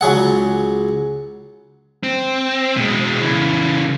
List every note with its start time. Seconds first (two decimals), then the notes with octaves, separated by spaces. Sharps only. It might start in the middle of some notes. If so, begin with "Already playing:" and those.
0.01 C#2 F#3 G#4 F#5
2.03 C4
2.77 B2 G#3
3.21 C#3 E3